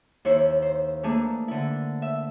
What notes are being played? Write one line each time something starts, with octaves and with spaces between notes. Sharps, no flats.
D#2 E4 C5 C#5
C5
E3 A3 A#3 D4 G#4
D3 E4
E5